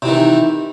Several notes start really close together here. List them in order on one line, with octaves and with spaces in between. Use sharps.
C3 E3 D#3